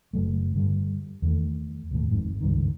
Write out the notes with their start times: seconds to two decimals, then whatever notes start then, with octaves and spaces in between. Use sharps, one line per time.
0.13 F#1 F#3 A3
0.54 G2 D3 G3
1.22 E2 D#3 A3
1.91 E1 D#2 A2
2.11 G#1 F2 G#2
2.41 C#2 G2 D#3